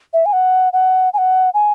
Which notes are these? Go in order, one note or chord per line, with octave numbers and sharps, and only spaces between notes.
E5
G#5
F#5
F#5
G#5
F#5
G#5